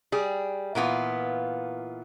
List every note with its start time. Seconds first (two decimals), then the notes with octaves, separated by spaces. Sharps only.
0.12 G3 G#4
0.75 A#2 E3 B3 F4